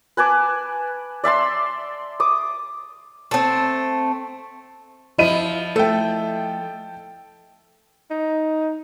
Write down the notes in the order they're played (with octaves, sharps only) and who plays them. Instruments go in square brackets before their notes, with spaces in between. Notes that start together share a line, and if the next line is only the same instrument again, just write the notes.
[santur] B4 G#5 A5 D6
D5 E5 A5 C6
D6 D#6
[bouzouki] A3 C4
[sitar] F3 E4 [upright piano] D#5 D#7
[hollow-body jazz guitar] A3 [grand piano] A4 G5
[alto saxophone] D#4